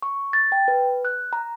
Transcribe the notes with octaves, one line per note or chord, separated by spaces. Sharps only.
C#6
A6
G5
B4
F#6
A#5